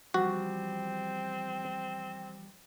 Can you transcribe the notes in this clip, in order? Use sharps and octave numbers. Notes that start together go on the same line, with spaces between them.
E2 F3 G3 C4 F#4